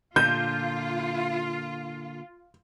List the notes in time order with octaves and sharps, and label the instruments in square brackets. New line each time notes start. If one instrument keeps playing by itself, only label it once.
[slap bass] A#2 D3 [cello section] F4 [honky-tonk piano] G6